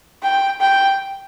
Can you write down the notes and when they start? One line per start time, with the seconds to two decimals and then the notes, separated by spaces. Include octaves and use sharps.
0.23 G5
0.60 G5